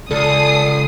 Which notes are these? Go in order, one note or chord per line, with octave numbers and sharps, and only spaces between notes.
C#2 A4 D5 D#6 C7